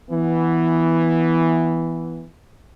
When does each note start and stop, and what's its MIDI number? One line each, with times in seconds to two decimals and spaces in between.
0.10 2.25 52
0.10 2.25 59